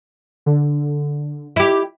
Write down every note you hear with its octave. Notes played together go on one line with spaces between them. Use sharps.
D3
E4 G4